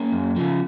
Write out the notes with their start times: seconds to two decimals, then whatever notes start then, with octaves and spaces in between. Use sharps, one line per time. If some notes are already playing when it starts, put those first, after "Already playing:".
Already playing: A#3 C#4
0.12 F#2
0.36 C#3 F3